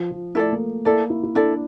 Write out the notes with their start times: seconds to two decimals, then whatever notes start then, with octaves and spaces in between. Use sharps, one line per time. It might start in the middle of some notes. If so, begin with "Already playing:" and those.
Already playing: F3
0.11 F3
0.35 A3 E4 A4 D5
0.52 A#3
0.85 A#3 E4 A4 D5
1.10 E4
1.23 E4
1.35 D4 E4 A4 D5